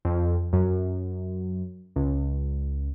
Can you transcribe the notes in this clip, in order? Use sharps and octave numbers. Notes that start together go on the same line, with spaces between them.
F2
F#2
C#2